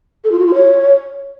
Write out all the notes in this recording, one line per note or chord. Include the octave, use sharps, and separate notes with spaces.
A4
F4
F#4
F4
C#5